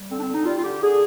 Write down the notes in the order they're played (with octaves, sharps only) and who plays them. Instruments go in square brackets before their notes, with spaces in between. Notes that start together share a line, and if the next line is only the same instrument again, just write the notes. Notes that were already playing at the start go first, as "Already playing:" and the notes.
Already playing: [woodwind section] G3
D3 C4
D4
C4
D3
D#4
G3 F4
F4
D3 G4
D3 G#4